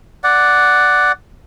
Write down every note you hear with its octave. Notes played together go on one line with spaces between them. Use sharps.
D5 F#5